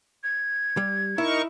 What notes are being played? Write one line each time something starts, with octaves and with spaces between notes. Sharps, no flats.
G#6
G3
D#4 E4 A#4 C#6